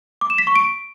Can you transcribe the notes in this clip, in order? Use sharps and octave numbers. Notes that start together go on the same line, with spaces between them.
D6
E7
B6
C#6
D7